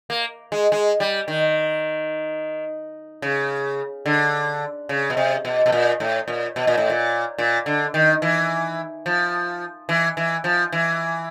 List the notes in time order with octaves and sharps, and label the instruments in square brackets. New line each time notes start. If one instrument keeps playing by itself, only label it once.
[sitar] A#3
G#3
G#3
G3
D#3
C#3
D3
C#3
B2
C3
B2
B2
A#2
A2
A#2
B2
A#2
A2
A#2
A#2
D3
D#3
E3
F3
E3
E3
F3
E3